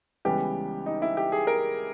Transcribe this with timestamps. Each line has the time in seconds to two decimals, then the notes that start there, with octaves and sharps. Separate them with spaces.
0.25 C#2 C#3 E3 G3 B3 G4
0.86 D#4
1.02 E4
1.17 G4
1.32 G#4
1.47 A#4